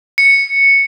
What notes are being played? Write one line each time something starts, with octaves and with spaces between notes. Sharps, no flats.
C#7